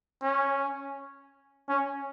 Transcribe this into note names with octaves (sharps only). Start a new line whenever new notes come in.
C#4
C#4